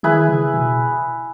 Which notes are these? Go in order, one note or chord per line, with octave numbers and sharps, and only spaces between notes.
D#3 E4 G#4 B4
C#3
B2